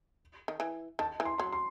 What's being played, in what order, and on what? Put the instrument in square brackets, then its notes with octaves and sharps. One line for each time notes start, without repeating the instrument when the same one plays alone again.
[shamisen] D#3
E3
[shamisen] D#3 [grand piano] A5
[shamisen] E3
[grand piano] C6
[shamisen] F#3 [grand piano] C6
[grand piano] C6